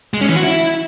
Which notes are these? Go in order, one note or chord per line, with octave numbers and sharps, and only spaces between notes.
G#3
C#4
E3
F#4
E4